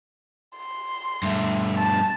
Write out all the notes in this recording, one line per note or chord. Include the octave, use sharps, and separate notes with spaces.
C6
G2 A3
A5